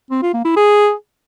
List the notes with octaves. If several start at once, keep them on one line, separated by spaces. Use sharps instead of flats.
C4
F4
A#3
E4
G#4